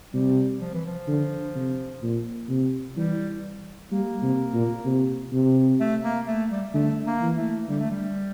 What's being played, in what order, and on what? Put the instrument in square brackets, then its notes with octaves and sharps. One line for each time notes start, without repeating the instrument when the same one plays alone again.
[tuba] C3 [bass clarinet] G3
[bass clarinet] F3
E3
F3
[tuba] D3
C3
A#2
C3
[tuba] E3 [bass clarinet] G3
[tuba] G3 [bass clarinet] A#3
[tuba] C3
A#2
C3
C3
[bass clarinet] A3
A#3
A3
G3
[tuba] D3 [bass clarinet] A3
[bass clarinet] A#3
[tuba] E3
[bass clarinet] A3
[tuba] D3 [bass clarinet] G3
[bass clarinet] A3
G3